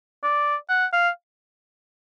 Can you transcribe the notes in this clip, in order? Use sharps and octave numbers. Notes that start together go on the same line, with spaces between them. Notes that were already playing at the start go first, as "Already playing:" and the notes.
D5
F#5
F5